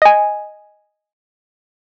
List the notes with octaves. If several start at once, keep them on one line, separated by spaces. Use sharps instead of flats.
D#5 G#5